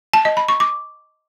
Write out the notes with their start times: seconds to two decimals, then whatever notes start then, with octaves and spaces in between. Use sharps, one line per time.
0.13 A5
0.25 D#5
0.37 B5
0.48 C#6
0.60 D6